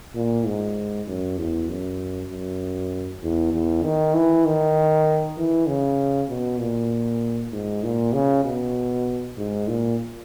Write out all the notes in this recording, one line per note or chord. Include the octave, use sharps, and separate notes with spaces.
A#2
G#2
F#2
E2
F#2
F#2
E2
E2
D#3
E3
D#3
E3
C#3
B2
A#2
G#2
A#2
C#3
B2
G#2
A#2